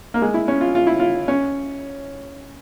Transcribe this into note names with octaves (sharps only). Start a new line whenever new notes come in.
A#3
G#3
E4
C#4
F4
F4
E4
F4
C#4